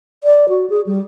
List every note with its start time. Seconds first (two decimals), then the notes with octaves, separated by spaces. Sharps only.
0.24 D5
0.49 F#4
0.70 G#4
0.86 G3